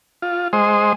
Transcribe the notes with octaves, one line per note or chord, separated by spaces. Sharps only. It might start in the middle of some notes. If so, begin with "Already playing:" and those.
F4
G#3 C5 D#5